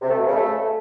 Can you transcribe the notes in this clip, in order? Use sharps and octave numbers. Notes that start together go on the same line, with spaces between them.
C3
A3
B2
C#3
A3